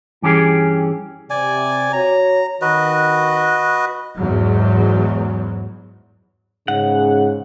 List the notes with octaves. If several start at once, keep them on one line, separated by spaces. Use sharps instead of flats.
G2 E3 C#4 G4 G#4
C3 D5 G#5
F#4 C#5 A#5
D#3 F#4 B4 D#5
E2 G#2 F#3
G#2 C#3 F#5